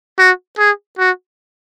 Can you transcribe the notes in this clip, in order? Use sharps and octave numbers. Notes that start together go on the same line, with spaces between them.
F#4
G#4
F#4